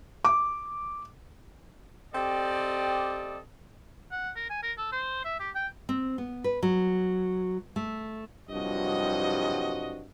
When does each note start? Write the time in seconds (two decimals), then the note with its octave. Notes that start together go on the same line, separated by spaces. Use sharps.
0.25 D6
2.14 C4 G4 A4 D5 D#5
4.11 F#5
4.36 A#4
4.50 G#5
4.63 A#4
4.78 A4
4.92 C5
5.25 E5
5.39 G4
5.55 G5
5.89 C4
6.18 B3
6.44 B4
6.63 F#3
7.76 A3
8.50 C2 G2 F3 F#3 F#4 D#5